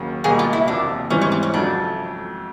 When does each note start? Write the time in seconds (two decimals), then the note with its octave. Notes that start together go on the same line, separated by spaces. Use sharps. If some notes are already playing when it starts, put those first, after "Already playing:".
Already playing: D#2 C#3 F#3
0.24 C#2 B2 G3 A#3 G#4
0.39 F4
0.53 E4
0.67 F#1 E2 C3 D4
1.10 G#2 E3 G3 C4 C#4
1.22 C#4
1.32 C4
1.43 C#4
1.54 F2 C#3 F#3 A3 D4